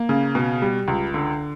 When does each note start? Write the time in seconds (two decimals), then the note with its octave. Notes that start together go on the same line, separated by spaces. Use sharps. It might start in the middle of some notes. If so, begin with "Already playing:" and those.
Already playing: A#3
0.09 C#3
0.35 B2
0.62 G3
0.88 C#2
1.14 D3